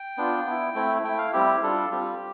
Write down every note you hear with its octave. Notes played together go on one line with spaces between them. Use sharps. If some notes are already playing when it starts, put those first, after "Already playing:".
Already playing: G5
B3 D4 F4
B3 E4
A3 C4 E4
A3 E4 G5
F5
G3 C4 E4 G4
G3 D4 F4 A4
G3 C4 F4 G4